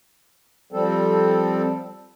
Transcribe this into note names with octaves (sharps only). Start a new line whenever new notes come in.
F3 G3 C4 A4